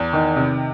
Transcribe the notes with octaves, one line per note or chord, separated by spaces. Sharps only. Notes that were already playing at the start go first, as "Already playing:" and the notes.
Already playing: E2
D#3
C3